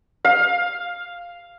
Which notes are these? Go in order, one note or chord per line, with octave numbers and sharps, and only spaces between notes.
F5